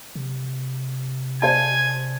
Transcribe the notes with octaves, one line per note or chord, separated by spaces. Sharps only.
C3
C5 D5 G#5 A5 G#6